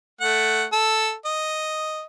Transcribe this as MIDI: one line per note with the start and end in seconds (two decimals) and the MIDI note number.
0.21 0.65 57
0.21 0.65 78
0.72 1.13 69
1.25 2.04 75